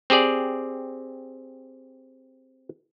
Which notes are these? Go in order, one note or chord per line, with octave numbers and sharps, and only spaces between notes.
C4 G4 G#4 D5